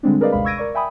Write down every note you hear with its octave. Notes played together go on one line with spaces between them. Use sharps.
D3 G3 G#3 C4 D4
G#4 A#4 B4 D5 D#5 F5
A1 D#2 C3 G#3 F5 B5
C#6 E6 G#6 A#6 D7 D#7
A#4 D5 C#6
E5 G5 G#5 B5 D#6